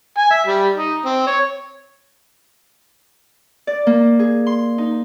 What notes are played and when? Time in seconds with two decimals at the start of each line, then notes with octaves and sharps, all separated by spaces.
0.18 G#5
0.31 E5
0.46 G3
0.75 D#4
1.05 C4
1.27 C#5
3.67 D5
3.87 A#3
4.19 G#4
4.47 C6
4.78 D#4